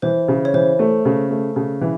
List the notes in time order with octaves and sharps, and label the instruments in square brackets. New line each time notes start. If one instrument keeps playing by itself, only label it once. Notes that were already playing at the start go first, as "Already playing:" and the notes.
[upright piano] E3 [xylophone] C5
[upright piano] C#3
[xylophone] C#5
[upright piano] E3 [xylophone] C5
[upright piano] A3
C#3
A3
C#3
E3